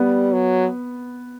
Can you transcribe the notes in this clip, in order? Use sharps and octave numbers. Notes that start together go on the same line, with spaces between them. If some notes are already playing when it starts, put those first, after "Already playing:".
Already playing: G3 B3
F#3